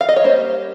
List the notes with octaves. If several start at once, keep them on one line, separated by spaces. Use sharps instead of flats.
F5
D#5
C#5
G3 A#3 C#4 C5